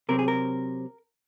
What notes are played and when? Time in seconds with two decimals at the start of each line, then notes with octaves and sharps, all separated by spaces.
0.09 C3 F#3 C4 A#4
0.19 G#4
0.28 A#4